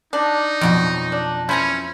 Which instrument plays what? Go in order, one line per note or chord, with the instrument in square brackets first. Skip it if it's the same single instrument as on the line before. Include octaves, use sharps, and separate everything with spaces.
[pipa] D4 [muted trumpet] D#4
[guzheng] F2 B2 F#3
[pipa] D4
[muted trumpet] C#4 [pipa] E4 [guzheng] C5 G#5 A#5